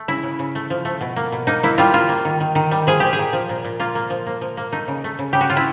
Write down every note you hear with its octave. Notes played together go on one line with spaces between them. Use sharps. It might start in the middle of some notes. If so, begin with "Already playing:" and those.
Already playing: A3
C#3 E4
C#3
C#3
A3
F3
A3
B2
A#3
B2
A#3 D#4
A#3 E4
G3 F4
A#3 F4
A#3
D#3
D#3
D#3
G3
F3 G#4
A#2 G4
G#4
A#2
F3
A#2
A#2
A#3 F4
A#3
F3
A#3
F3
A#3
A3 D#4
C#3
A3
C#3
C#3 G4
F#4
C#3 F4
E4